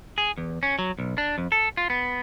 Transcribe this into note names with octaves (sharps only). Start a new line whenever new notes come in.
G#4
E2
C#4
F#3
B1
D4
F2
A4
F4
B3